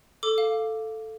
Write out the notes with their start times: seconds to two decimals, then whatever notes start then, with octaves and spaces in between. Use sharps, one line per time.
0.23 A4 D6
0.38 F5